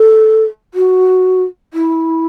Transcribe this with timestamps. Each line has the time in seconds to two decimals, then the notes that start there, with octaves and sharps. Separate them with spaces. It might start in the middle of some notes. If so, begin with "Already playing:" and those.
Already playing: A4
0.74 F#4
1.74 E4